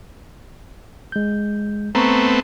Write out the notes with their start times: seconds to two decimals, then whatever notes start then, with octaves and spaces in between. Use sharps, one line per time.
1.12 G#3 G6
1.95 A3 B3 C4 A#5 C#6